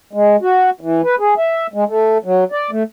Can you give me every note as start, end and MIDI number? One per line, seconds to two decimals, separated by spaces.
0.13 0.36 56
0.42 0.70 66
0.81 1.01 52
1.04 1.15 71
1.20 1.34 68
1.38 1.67 76
1.74 1.84 56
1.88 2.18 57
2.25 2.44 54
2.52 2.71 74
2.71 2.83 57